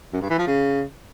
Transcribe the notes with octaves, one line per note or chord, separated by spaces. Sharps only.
F#2
G2
E3
F3
C#3